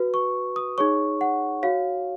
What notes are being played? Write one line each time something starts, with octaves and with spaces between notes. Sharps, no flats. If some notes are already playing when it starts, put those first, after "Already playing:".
Already playing: F#4 B4
C#6
D#6
D#4 G#4 C#5 C#6
F#5
F#4 C#5 F5